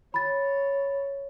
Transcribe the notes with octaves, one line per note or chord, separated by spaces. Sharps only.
C#5 B5 A6